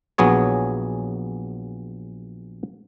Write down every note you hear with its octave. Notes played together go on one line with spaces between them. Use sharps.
A#1 F#3 B3 G#4 C#5